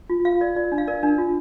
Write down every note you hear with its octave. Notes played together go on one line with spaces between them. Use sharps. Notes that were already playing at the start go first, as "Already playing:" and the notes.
F4
F4 F5
A#4 D5
F4 D5
D4
F5
A#4 D5
D4
F4